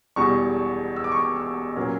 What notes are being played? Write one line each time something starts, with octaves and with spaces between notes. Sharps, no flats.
E1 E2 B2 G3 C#6
E6
D6
C#6
D6
E6
A#2 F#3 A#3 C#4